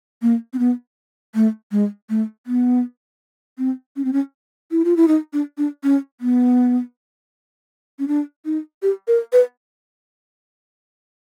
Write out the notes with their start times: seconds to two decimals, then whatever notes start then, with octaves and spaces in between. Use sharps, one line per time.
0.22 A#3
0.53 C4
0.59 B3
1.35 A3
1.72 G#3
2.10 A3
2.47 B3
3.58 C4
3.96 C#4
4.05 C4
4.13 C#4
4.71 E4
4.85 F4
4.97 E4
5.08 D#4
5.33 D4
5.58 D4
5.84 C#4
6.21 B3
7.99 C#4
8.08 D4
8.45 D#4
8.82 G4
9.08 A#4
9.33 B4